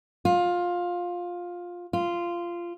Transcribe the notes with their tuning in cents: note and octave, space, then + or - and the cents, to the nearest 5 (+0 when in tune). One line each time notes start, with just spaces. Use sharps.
F4 +15
F4 -15